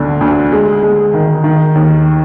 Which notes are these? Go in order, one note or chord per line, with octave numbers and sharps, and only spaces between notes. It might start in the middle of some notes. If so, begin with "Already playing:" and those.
Already playing: D2 D3
D2
G#3
G#3
D#3
D#3
D#2